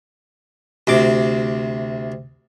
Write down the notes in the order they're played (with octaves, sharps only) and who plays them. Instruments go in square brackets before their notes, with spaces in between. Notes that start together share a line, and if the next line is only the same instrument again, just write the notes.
[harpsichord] D2 C3 D6